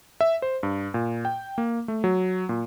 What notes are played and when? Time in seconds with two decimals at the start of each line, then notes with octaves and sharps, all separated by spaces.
0.21 E5
0.42 C5
0.63 G2
0.94 A#2
1.25 G5
1.58 A#3
1.88 A3
2.04 F#3
2.49 A#2